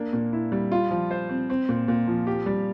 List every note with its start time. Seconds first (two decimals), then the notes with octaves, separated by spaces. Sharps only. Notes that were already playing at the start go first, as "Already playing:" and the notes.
Already playing: A#3 D4
0.13 A#2
0.33 E4
0.52 G3
0.72 F4
0.91 F3
1.11 C5
1.29 C4
1.50 C4
1.69 A#2
1.88 A#2
2.08 F3
2.27 G4
2.46 G3